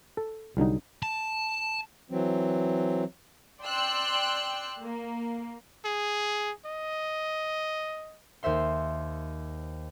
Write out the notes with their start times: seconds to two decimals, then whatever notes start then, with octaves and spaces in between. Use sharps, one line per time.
0.17 A4
0.57 C2 D3 F#3 D#4
1.02 A5
2.11 E3 F#3 C4
3.62 D5 G5 C6 E6 F#6
4.81 A#3
5.85 G#4
6.65 D#5
8.43 D#2 C5 E5 C6